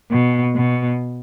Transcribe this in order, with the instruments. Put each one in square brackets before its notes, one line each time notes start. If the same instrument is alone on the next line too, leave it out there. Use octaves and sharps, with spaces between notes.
[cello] B2
B2